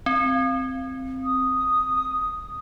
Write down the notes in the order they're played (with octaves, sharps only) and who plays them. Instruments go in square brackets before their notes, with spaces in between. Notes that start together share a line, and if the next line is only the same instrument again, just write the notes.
[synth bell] C4
[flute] D#6